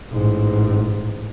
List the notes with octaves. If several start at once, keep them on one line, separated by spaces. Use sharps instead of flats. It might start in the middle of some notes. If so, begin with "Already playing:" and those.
A1 G#2